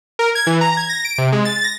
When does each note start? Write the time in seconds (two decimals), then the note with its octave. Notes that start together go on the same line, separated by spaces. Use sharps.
0.19 A#4
0.35 G#6
0.47 E3
0.61 A#5
0.77 G#6
0.89 A#6
1.05 D7
1.18 C3
1.32 G#3
1.45 A6
1.64 A#6